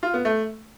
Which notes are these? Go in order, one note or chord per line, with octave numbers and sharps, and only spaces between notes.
F4
B3
A3